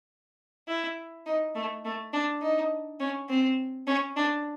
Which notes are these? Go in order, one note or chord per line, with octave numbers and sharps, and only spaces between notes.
E4
D#4
A3
A3
D4
D#4
C#4
C4
C#4
D4